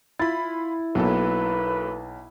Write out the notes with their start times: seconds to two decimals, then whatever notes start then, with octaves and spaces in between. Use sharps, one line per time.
0.19 E4 F4 B5 A6
0.95 B1 F#3 A#3 A4 B4